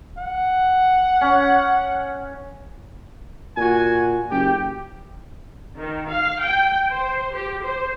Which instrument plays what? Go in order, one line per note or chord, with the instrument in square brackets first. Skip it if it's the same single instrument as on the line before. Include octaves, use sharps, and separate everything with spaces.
[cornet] F#5
[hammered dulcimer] C#4
[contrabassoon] A#2 [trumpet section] F#4 G#5
[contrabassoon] F#1 [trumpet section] G4
[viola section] D#3
F5
G5
C5
G4
C5